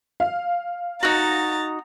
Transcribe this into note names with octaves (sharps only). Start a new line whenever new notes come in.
F5
D#4 F#4 A#5 A6